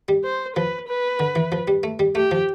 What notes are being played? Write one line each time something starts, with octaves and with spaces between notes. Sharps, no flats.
G3
C5
F3 B4
B4
D3
E3
F3
G3
A3
G3
A3 G4
F3